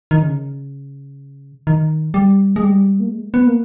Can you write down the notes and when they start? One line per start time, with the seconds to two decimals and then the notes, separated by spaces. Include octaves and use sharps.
0.11 D#3
0.23 C#3
1.67 D#3
2.14 G3
2.56 G#3
2.63 G3
3.00 A#3
3.10 G#3
3.34 B3
3.47 A#3